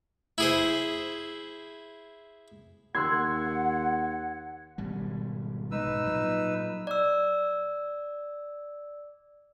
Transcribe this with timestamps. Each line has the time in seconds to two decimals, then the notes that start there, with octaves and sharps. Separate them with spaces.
0.38 E4 G#4 C5
2.95 D#2 F#5 C6 E6 F#6 G#6
4.78 G#1 B2 G3
5.71 B1 G#2 D#4 B4 E6
6.04 A#2 F#3
6.87 D5 E6